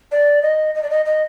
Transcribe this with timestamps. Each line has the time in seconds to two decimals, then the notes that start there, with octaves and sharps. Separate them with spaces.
0.12 D5
0.42 D#5
0.75 D#5
0.83 D5
0.90 D#5
1.05 D#5